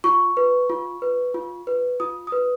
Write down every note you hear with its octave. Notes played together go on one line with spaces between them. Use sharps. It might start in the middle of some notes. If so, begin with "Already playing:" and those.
F4 C#6
B4
F4
B4
F4
B4
F4 D#6
B4 D#6